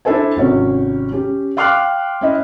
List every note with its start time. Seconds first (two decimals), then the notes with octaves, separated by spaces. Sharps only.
0.05 D4 E4 A4 C5 G#5
0.36 G#1 C3 C#4 C#5
1.12 C#4 G4
1.57 F5 G5 C6 D6 F6 F#6
2.21 C#4 E4 D#5